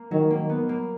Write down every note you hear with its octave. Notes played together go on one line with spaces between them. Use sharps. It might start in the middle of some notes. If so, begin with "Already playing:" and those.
Already playing: A#3
D#3 F#3
A#3
B3
A#3